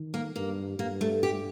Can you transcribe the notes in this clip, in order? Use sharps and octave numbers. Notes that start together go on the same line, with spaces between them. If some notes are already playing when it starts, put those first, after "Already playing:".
Already playing: D#3
A#3
G2 A#3
G2 A#3
A3
G4